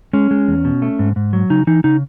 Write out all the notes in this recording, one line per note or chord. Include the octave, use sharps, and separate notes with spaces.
G#3 C#4
G#3
E2
B2
A3
G#2
G#2
F#3
C#3 D#4
E3 D#4
C#3 D#4